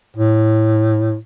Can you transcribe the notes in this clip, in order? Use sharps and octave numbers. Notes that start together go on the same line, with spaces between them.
A2